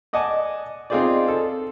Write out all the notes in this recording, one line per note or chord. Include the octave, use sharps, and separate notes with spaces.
D5 D#5 F#5 G#5 A5 D6
C4 D#4 F4 G#4 C5 D5
A4